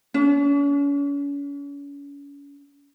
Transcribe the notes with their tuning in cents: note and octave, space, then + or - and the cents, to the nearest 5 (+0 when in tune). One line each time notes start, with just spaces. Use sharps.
C#4 +40